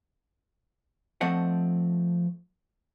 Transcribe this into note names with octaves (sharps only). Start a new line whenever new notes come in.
F3 A3 C4 D#5 F#5